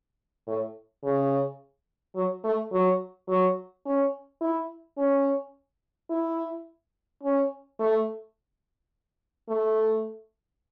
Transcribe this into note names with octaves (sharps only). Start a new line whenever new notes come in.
A2
C#3
F#3
A3
F#3
F#3
C#4
E4
C#4
E4
C#4
A3
A3